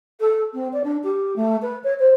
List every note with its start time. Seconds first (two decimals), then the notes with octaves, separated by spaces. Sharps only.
0.20 A4
0.53 C4
0.73 D5
0.84 D4
1.03 G4
1.36 A3
1.62 B4
1.84 C#5
1.99 C5